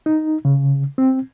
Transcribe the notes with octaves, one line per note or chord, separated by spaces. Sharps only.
D#4
C#3
C4